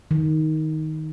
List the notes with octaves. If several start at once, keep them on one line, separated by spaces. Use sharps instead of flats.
D#3